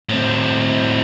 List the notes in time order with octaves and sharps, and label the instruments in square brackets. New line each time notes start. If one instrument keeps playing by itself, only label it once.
[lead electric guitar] A2 C4